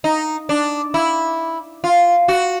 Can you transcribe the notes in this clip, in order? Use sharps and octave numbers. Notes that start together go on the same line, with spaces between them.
D#4
D4
E4
F4
F#4